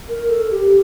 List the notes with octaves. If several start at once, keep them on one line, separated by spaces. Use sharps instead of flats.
A#4
A4
G4